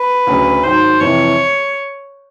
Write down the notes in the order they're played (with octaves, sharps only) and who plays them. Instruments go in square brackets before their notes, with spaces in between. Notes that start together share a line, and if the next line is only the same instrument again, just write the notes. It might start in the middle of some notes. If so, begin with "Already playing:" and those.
Already playing: [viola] B4
[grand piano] D2 C#3 F#3
[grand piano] G#2 D#3 F#3 [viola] C5
[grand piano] F2 C3 E3 [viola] C#5